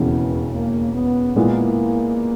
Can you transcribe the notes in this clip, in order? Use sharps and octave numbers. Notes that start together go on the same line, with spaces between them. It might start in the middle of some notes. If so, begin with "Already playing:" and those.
Already playing: E1 D#2 C#3 E3 B3
A#3
B3
A#2 G#3 A#3 B3 E4